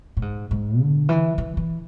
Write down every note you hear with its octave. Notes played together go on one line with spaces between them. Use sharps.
A2
G#2
G#2
D3
E3
E3
E3